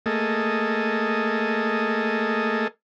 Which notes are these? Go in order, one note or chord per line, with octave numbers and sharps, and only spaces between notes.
A3 A#3 G#4 A4 D#5